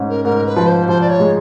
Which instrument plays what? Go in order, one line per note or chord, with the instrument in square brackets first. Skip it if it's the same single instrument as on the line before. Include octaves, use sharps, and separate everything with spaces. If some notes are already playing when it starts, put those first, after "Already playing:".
Already playing: [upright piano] G#2 C#4
[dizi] A#4
[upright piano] G#2 [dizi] A#4
[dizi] B4
[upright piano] F3
[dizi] C5
[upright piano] F3 [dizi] C5
[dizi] D5
C#5
[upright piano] G#3